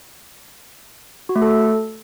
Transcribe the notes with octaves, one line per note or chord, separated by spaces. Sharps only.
F#4
A3
A4